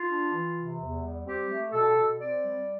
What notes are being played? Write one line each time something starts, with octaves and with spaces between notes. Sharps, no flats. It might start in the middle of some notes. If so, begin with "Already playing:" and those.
Already playing: F4
D4
E3
C3
E2
G3
C4 G4
A3
B2 A4
B2
C4 D5
G3